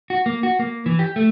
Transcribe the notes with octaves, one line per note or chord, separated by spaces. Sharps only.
F#4
A#3
F#4
A#3
E3
G4
A3